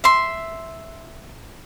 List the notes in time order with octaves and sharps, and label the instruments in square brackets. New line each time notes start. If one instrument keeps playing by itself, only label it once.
[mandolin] E5 C6